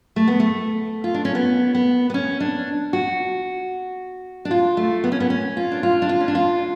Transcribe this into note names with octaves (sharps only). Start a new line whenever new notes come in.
A3
B3
A3
F4
D4
C#4
B3
B3
B3
C#4
D4
F#4
D4
F4
A3
B3
C#4
B3
C#4
F4
D4
F4
D4
F4
C#4
D4
F4